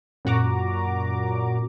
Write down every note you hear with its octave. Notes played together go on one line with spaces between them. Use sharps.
F#2 A#2 F#4 A#5 D6